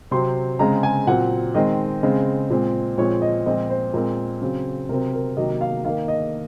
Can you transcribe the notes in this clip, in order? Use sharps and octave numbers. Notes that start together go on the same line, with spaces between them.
C3 F#3 C4 C6
C#3 G#3 C4 A#5
G#5
A#2 F#3 C4 F#5
D#3 G#3 C4 D#5
C#3 G#3 C4
A#2 G#3 C4
A#2 F3 G#3 C4 C#5
D#5
A#2 F3 G#3 C4 D#5
C5
A#2 G#3 C4 A#4
C#3 F#3 C4
C3 F#3 C4 A#4
A#4
C3 D#3 F#3 A#3 D#5
F5
D#3 A#3 F5
D#5